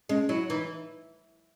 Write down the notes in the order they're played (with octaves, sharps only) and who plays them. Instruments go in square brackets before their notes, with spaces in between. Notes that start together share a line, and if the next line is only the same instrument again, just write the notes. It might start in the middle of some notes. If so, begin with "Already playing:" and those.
[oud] G#3 [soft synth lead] C#4
[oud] F#3 [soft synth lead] E4
[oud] E3 [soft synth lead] D#4